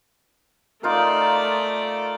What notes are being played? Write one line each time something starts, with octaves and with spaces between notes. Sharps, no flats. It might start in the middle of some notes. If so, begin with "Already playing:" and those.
A3 D#4 F4 A#4 D5